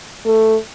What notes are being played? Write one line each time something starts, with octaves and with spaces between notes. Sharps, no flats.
A3